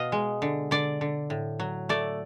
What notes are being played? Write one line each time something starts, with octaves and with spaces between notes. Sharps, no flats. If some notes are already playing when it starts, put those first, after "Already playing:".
Already playing: B2 D#5 F5
G#3
D3
D3 D5
D3
A2
F#3
A3 D5